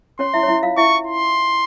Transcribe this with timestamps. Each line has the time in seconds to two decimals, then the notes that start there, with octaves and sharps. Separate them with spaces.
0.19 C#4 C#5 C6
0.34 E4 E5
0.43 C#5
0.48 E4 E5
0.63 F4 F5
0.77 E4 E5 C#6
1.07 C6